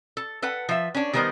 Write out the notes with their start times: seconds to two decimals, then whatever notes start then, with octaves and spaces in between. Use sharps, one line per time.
0.17 A4
0.42 A4 B4 F#5
0.69 F3 E5
0.95 C#4 D4
1.13 D#3 G3 B3 A#4 C5